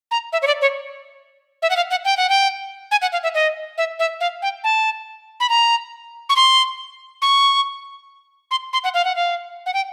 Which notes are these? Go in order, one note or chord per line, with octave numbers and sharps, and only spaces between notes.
A#5
E5
C#5
D5
C#5
E5
F#5
F5
F#5
G5
F#5
G5
G#5
F#5
F5
E5
D#5
E5
E5
F5
G5
A5
B5
A#5
C#6
C6
C#6
C6
C6
F#5
F5
F#5
F5
F#5
G5